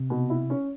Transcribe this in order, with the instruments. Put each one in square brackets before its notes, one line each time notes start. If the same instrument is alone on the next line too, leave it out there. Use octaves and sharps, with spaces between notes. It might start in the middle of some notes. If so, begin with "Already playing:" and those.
Already playing: [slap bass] C3
[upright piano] B2
E4
C#4